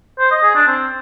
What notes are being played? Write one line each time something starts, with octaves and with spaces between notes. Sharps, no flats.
C5
D#5
G#4
D4
C4